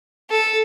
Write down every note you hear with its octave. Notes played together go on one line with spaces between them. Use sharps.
A4